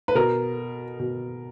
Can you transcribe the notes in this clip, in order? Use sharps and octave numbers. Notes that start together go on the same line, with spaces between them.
B4
B2 A#4
B2